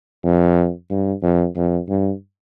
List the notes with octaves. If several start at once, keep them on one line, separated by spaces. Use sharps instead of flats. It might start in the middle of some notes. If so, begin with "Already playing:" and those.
F2
G2
F2
F2
G2